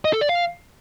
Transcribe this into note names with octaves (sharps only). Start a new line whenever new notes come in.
D#5
A4
D5
F5